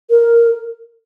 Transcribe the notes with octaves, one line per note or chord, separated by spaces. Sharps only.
A#4